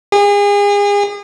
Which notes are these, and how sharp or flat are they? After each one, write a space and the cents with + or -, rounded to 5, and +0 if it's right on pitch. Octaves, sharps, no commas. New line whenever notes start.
G#4 -35